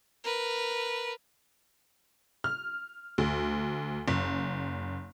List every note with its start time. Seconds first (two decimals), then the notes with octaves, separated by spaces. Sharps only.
0.24 A#4 B4
2.44 F6
3.18 D2
4.08 F#1